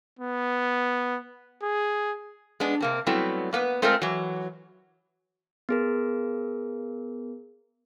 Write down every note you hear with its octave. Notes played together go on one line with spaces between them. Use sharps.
B3
G#4
G#3 B3 D4
C3 A#3 C4
F#3 G3 A3 B3 C4 E4
A#3 B3 B4
G#3 A3 C4 F4 A4 A#4
E3 F#3
B3 G#4 A#4